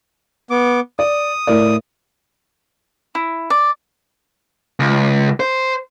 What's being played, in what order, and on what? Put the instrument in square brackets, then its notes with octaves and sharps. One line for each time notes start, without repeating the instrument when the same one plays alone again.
[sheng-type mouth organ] B3 D6
[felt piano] D5 [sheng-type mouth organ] D#6
[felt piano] A2 A#4 D5
[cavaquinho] E4
D5
[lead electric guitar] C#2
C5